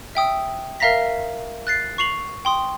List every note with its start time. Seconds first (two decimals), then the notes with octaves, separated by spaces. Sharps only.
0.15 E5 G5 D#6 E6
0.80 A#4 E5 F5 A#5 A#6 B6
1.67 F#6 A6 C7
1.98 C#6 C7 F7 F#7
2.45 G5 C6 D#6